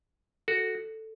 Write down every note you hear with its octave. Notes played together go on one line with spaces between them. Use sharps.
F#4 A4